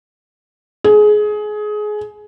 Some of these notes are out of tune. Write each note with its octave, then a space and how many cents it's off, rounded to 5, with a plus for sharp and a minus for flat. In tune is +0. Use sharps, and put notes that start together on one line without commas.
G#4 +20